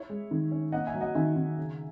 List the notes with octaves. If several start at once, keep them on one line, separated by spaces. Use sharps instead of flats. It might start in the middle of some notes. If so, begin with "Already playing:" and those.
Already playing: E4 C#5 E5
G#3
D#3
C#4
A#3 D#5 F#5
E5 G#5
F#3
D#5 F#5
D#3 E5 G#5
D#3
C#3